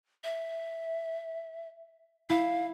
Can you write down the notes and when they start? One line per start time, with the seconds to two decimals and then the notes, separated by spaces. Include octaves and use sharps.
0.24 E5
2.30 E4 F5